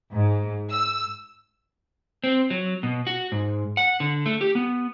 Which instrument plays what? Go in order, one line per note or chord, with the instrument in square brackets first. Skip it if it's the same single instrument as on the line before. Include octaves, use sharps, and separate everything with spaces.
[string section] G#2
E6
[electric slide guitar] C4
F#3
B2
F#4
G#2
F#5
D3
A3
G4
B3